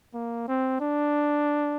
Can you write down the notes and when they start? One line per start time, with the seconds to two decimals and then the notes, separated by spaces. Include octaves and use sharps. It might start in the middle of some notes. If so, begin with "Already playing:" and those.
0.14 A#3
0.48 C4
0.81 D4